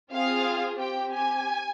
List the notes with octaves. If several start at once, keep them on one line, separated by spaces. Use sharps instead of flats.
C4 F4 G#4 F5
C4 G4 G5
G#5